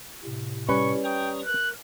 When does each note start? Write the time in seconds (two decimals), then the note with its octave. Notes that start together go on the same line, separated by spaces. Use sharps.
0.24 A2 C3
0.69 G3 C#4 B4 C#6
1.04 G5 A#5 C#6 D#6
1.46 A#4 F#6